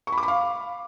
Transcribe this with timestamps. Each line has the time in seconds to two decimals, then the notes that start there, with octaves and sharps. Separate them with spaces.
0.07 C#6
0.12 B5
0.18 D6
0.23 B5
0.28 F5